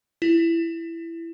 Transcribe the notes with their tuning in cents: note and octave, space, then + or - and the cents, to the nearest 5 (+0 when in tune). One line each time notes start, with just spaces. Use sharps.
E4 +15